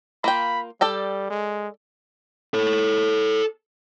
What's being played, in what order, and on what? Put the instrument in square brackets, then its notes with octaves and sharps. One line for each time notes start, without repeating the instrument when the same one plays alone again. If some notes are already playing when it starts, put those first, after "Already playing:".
[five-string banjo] A#3 F4 G5 [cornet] B5
[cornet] G3 [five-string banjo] A4 D5 G5
[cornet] G#3
[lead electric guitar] A4 C#5